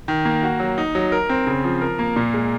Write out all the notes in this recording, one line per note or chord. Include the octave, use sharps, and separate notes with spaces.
D#3
A#3
F#4
F#3
D#4
F#3
A#4
C4
C#3
F3
A#4
A#3
A#2
G#3